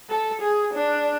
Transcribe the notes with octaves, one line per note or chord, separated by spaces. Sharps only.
A4
G#4
D4